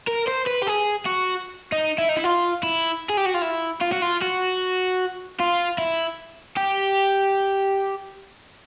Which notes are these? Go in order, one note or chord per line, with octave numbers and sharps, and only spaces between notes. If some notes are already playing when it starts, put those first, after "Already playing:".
A#4
C5
B4
G4
G#4
F#4
D#4
E4
D#4
E4
F4
E4
G#4
G4
F#4
F4
E4
F4
F#4
F4
F#4
F4
E4
G4